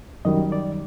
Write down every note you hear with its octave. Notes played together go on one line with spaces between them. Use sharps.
F#2 D#3 G3 D#5
D5